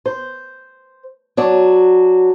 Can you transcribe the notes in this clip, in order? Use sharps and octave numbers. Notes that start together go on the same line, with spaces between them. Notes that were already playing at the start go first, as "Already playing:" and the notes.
C5
F#3 D4 F#4